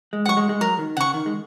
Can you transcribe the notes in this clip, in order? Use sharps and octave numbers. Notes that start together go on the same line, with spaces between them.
G#3
F#3 F#5 C#6
G#3
G#3
F#3 A#4
D#3
C#3 F#5 C#6
D#3
G#3